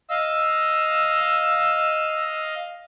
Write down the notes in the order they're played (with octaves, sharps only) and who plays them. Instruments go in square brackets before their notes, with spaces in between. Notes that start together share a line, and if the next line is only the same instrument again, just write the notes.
[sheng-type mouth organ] D#5 F5 [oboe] E6